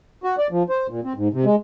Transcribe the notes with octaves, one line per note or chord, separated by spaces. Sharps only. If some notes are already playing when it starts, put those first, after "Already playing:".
F#4
D5
F3
C5
A#2
C4
G#2
C3
G#3